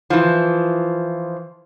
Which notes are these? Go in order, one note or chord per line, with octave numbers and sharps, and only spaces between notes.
E3 F3